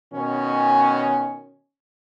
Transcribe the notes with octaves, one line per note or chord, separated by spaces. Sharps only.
B2 D#3 C#4